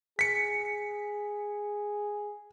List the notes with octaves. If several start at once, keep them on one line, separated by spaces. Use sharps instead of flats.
G#4 B6 C#7